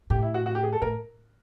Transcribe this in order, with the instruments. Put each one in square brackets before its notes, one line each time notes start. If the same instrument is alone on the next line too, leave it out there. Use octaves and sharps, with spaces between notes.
[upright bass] A2 [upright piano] G4
[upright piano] E4
F#4
F#4
G4
G#4
A4
[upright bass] A2 [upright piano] A#4